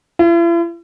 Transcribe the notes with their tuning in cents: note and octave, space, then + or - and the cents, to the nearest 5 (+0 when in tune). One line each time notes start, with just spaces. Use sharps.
E4 +45